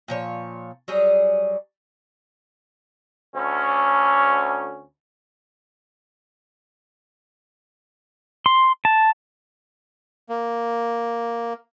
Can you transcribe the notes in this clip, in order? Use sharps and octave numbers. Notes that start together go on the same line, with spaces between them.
A#2 F3 C#5
F#3 G3 G#4
D2 C#4
C6
A5
A#3